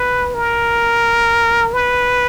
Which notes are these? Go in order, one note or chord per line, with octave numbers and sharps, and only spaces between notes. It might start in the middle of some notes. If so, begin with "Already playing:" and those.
Already playing: B4
A#4
B4